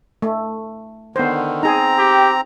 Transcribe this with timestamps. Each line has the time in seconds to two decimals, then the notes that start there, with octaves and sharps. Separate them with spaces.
0.22 A3
1.16 D3 D#3 B3 C5
1.63 C4 D#4 G#4 A#5
1.98 G4